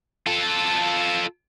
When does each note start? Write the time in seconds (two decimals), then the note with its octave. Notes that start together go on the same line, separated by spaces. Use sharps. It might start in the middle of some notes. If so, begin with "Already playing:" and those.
0.27 F4 A4